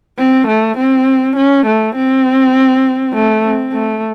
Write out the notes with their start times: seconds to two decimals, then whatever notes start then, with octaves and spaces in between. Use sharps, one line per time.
0.18 C4
0.47 A3
0.78 C4
1.36 C#4
1.66 A3
1.96 C4
3.14 A3
3.44 C4
3.73 A3